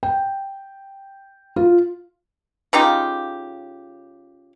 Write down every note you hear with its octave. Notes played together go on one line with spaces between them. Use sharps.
G5
F4
C#3 D#4 F4 G4